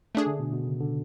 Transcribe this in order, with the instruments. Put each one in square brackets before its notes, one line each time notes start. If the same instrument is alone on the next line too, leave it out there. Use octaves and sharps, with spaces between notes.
[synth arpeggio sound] A3 D4 G#4
[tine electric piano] D3
B2
B2
C#3
D3